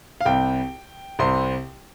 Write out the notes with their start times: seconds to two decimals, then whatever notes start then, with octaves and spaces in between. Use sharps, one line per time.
0.21 F5
0.26 C2 C3 G5
1.19 C2 C3 C6